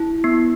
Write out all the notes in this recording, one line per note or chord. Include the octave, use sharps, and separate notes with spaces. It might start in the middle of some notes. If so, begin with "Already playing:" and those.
Already playing: E4
B3